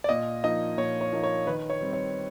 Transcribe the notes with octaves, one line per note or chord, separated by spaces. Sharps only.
D5
A#2 D#5
F3 A#3 D#4 D#5
A#2 C#5
C#5
F3 A#3 D#4
C#5
D#3 B4
C#5
G3 C4
C#5